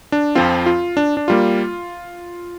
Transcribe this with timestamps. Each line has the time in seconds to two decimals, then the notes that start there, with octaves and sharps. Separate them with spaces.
0.12 D4
0.35 F2 F3 C4 F4
0.66 F4
0.97 D4
1.17 D4
1.28 G3 A#3 F4